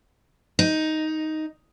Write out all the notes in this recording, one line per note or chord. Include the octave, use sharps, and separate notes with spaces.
D#4